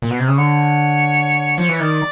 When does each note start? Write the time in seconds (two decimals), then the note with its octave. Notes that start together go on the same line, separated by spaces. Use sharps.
0.02 A#2
0.10 B2
0.19 C3
0.28 C#3
0.37 D3 C#5
1.58 F3
1.69 E3
1.80 D#3 D5